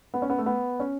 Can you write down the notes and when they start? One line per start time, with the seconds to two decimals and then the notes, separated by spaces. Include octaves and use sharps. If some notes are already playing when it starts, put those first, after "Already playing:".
0.14 B3
0.22 C#4
0.30 B3
0.38 A3
0.46 B3
0.80 C#4